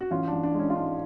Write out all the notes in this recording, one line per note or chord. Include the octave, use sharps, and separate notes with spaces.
F#4
A1 C#4 F4
A1 D4
D4
G#3
C#4
F4
G#2 D4